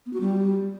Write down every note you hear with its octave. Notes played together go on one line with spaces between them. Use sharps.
B3
F#4
G3